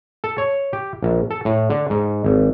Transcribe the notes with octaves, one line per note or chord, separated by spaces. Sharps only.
A4
C#5
G4
A#1
A4
A2
D3
G#2
G#1